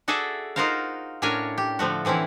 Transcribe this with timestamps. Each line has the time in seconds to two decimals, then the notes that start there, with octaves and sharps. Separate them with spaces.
0.08 F#4 G#4 A4 D5 E5
0.56 D#4 F4 F#4 A#4 C5 F5
1.22 A2 C#4 D4 A#4 C#5 G#5
1.58 G4
1.79 D3 F3 A3 F#4
2.05 D3 E3 C4 C#4 E4